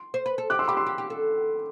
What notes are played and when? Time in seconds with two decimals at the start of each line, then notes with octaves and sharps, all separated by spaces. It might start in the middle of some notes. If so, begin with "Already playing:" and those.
Already playing: C6
0.14 C5
0.26 B4
0.38 A4
0.50 G4 D6 F#6
0.59 C6 E6
0.68 G4 B5 D6
0.77 C6 E6
0.87 G4
0.98 G4
1.10 A4